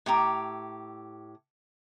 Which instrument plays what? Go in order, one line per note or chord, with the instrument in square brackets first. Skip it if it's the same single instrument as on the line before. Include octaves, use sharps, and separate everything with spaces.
[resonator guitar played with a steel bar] A2 G4 A#5